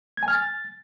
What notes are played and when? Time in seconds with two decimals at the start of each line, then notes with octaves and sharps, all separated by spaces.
0.17 G#6
0.23 G#5
0.28 F6
0.33 A6